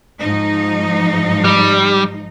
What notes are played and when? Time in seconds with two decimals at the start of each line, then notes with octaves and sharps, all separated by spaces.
0.18 G#2 F3 D#4
1.44 G3